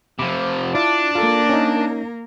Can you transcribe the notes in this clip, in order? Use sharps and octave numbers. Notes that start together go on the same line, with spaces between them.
C3 F3 B5 D6
D4 E4 F4 D5
A#3 F4 A4 A#4
C#4 D#4